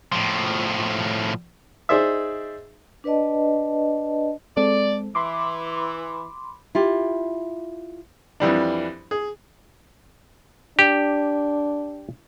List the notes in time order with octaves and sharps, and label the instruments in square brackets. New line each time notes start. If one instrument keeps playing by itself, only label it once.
[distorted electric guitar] A2 F3
[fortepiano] D#4 G#4 C5 D5 E5
[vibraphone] D4 B4 D5 D#5 A5
[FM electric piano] G#3 C4 A4 [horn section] D5
[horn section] E3 [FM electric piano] B5 C6 D6
[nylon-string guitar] E4 F4 G4
[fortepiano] F2 E3 G3 D4
G#4
[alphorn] D4 [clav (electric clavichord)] G4